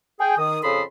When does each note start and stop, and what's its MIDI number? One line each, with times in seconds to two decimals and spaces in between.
0.20 0.35 68
0.20 0.35 79
0.37 0.58 51
0.37 0.58 87
0.63 0.82 41
0.63 0.82 49
0.63 0.82 69
0.63 0.82 83
0.63 0.82 84
0.63 0.82 87